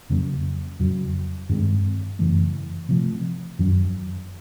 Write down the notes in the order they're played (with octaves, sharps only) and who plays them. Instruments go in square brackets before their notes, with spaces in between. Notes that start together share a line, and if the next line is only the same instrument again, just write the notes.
[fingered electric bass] F2 C#3 F#3 A#3
F2 C#3 F#3
G2 D#3 G#3 C4
F#2 C#3 E3 A3
C3 F3 A3
F#2 D#3 F#3